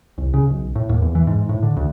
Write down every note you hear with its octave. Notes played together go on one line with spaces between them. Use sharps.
C2
C#3
B1
A2
D#2
E2
E3
G#2
A2
D3
D2